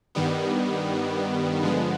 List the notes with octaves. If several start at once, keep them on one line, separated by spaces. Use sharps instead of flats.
G2 D#3 G3 B3
G2 D3 F3 G#3 B3